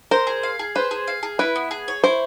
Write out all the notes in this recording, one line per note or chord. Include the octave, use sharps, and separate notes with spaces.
A#4 C5
G#4
F5
G#4
B4 C5
G#4
F5
G#4
E4 B4
B3
G#4
C#5
E4 C5